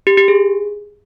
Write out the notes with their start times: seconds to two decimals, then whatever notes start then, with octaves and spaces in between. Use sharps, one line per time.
0.07 G4
0.17 G4
0.28 G#4